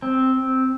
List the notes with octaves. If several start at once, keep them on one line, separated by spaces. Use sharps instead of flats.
C4